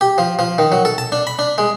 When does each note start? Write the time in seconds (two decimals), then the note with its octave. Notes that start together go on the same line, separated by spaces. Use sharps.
0.01 G4
0.18 F3
0.39 F3
0.58 D#3
0.72 F#3
0.85 A4
0.98 A5
1.12 D4
1.27 B5
1.39 D4
1.58 G#3